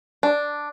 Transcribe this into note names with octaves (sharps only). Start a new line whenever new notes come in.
D4